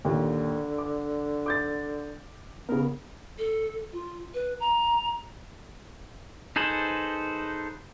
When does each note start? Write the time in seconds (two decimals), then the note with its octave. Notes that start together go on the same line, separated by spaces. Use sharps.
0.05 D#2 A#2 D3
0.78 D6
1.46 D6 G6 A6
2.69 C#3 B3 A#4
3.38 A4
3.93 F4
4.34 B4
4.60 A#5
6.56 D#4 G#4 A4 B4 C5